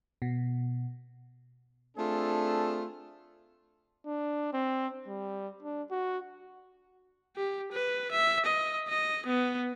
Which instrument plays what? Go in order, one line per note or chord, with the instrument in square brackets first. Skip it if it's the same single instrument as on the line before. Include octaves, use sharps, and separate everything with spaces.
[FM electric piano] B2
[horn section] A3 C4 D4 F4 G#4 A4
[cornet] D4
C4
G3
D4
F#4
[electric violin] G4
B4
E5
D#5
D#5
B3